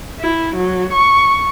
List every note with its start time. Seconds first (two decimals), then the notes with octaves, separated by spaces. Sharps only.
0.20 E4
0.55 F#3
0.93 C#6